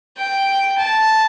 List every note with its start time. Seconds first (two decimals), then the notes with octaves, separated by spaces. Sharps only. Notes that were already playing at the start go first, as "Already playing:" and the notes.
0.17 G5
0.78 A5